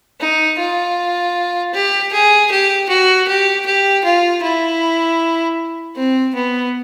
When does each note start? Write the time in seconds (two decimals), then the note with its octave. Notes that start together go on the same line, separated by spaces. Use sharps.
0.20 D#4
0.59 F4
1.73 G4
2.12 G#4
2.51 G4
2.89 F#4
3.28 G4
3.66 G4
4.04 F4
4.42 E4
5.96 C4
6.34 B3